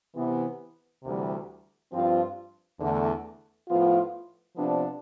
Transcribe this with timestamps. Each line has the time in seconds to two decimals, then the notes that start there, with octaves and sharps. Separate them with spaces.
0.15 C3 E3 B3
1.03 D2 C3 E3 G3
1.92 G2 F3 C4 F4
2.80 E2 D3 A3
3.69 A2 F3 B3 F4
4.56 C3 F3 B3 D4